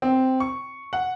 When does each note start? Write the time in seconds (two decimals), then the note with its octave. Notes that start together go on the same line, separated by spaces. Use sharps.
0.02 C4
0.40 C#6
0.93 F#5